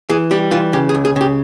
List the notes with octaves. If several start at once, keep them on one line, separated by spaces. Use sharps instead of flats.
E3 G#4
G3 G4
E3 F4
C#3 G4
G#4
C#2
G#4
C#3 G4